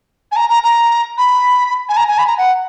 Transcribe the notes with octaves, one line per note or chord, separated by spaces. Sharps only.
G#5
A#5
A#5
A#5
B5
G#5
A#5
G#5
B5
A#5
F#5